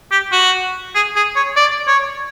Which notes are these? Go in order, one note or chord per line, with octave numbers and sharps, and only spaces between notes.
G4
F#4
G#4
G#4
C#5
D5
C#5